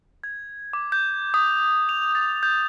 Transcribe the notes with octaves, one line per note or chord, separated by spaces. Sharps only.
G#6
D6
G6
D#6
F7
A6
G6